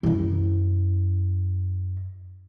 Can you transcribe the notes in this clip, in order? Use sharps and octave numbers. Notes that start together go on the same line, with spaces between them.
F#2 E4